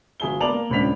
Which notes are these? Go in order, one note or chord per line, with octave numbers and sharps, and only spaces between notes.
G1 F#4 G#4 E5 G7
B3 A#4 D5 A5 F7 F#7
A#3
D#1 C#2 C4 D4 B6 F7